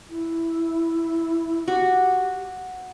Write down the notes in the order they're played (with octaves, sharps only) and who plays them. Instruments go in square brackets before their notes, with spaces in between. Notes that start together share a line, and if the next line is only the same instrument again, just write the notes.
[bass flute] E4
[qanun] F#4 [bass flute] G4